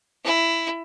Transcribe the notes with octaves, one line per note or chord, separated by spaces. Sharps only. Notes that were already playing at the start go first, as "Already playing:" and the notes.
E4